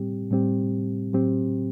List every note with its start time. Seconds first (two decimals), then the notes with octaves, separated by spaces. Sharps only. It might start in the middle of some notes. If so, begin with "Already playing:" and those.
Already playing: A2 G3 C4 G4
0.31 A2 G3 C4 G4
1.13 A2 F#3 C4 G4